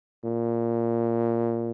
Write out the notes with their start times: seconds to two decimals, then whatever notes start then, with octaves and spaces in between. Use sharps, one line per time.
0.24 A#2